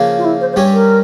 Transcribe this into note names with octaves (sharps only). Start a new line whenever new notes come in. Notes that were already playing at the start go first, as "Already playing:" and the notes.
Already playing: C#3 F3 A#3
F4
E4
C5
C5
G2 G3 C#4 G4 C#5
A#4